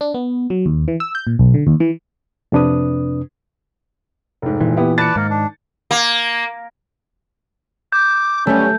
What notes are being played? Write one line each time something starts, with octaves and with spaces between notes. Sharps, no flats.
D4
B3
F#3
D#2
E3
E6
G6
A#2
B1
D3
D#2
E3
F2 C3 D4 B4 D#6
F1 G#2
A#2 E3
B3 E4 G4
B4 D5 A5 A6 C#7
G#2 D#3 A#3
D4
A#3
D6 G6
G3 A3 C#4 G4